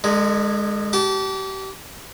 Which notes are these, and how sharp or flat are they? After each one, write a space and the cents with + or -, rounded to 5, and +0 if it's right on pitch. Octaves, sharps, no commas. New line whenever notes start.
D3 +40 G#3 +0
G4 -30 A5 -10